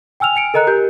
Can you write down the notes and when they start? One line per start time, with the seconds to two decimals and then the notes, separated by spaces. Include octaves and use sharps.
0.20 G5 G#5 E6 F6 F7
0.36 G#5 C#7 D7
0.54 A4 A#4 D#5 A#5 F#6
0.67 G4 A#4 G6